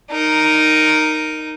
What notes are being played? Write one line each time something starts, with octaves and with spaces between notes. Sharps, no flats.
D#4 A#4